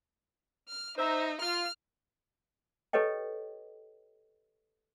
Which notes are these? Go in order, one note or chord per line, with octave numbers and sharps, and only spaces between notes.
F6
D#4 C5 E5 A#5
F4 F6
G4 A4 B4 C#5 D#5 G5